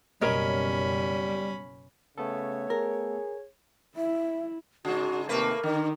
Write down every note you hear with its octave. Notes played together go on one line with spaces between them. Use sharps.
F#1 B2 G3 C#4 A#4 C#5 D#5 B5
C#3 A3 B3 A4 C#5
G#4 A#4
E4 E5
G#2 C#3 F#4
D#2 C3 A3 A#3 A#4 B4
D3 D#3